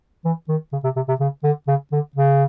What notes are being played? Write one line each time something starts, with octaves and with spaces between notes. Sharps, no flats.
E3
D#3
C#3
C3
C3
C3
C#3
D3
C#3
D3
C#3